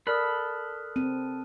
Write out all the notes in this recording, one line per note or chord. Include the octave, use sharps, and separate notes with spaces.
A4 A#4 D5 B5 D#6 F6 F#6
C4 D#7